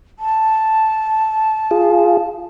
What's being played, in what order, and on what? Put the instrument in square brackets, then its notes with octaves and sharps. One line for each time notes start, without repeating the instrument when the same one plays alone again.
[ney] A5
[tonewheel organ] F4 G#4